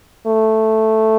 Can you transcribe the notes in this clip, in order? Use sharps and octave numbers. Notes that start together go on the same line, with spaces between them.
A3